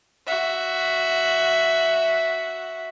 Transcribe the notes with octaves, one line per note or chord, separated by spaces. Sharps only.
F#4 E5